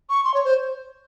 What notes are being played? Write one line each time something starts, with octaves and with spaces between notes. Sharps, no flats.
C#6
C6
C#5
C5